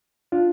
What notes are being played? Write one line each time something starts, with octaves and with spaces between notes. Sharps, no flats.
D4 F4